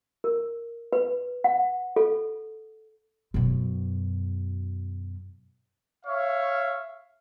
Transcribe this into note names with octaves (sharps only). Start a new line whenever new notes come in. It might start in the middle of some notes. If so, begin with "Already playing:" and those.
A#4
B4
F#5
A4
F#2 B2
C#5 E5 F5